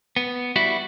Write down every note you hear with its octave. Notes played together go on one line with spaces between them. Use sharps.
B3
G3 E4 F#4